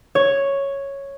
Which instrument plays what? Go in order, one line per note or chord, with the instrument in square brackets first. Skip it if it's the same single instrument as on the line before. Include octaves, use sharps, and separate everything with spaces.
[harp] C#5